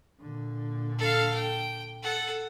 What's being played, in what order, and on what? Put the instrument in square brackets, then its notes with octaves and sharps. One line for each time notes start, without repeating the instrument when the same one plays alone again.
[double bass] A#2 D3
[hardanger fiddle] A4 F5
G5
A4 F#5